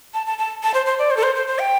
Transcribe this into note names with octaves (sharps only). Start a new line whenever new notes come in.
A5
A5
A5
A5
C5
C5
D5
C5
A4
C5
C5
C5
G5